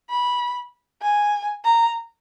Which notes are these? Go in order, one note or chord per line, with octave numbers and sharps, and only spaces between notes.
B5
G#5
A#5